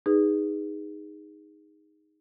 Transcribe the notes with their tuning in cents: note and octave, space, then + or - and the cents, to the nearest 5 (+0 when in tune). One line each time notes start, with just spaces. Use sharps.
D#4 +0 G#4 -20 B4 +0